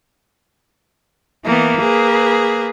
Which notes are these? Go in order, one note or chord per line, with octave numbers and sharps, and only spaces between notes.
E3 A#3 B3
G#4 B4